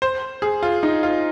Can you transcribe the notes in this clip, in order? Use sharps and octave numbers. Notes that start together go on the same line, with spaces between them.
C5
G#4
F4
D#4
F4